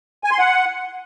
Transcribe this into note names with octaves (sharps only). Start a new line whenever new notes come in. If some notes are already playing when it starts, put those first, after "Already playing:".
G#5
C6
F#5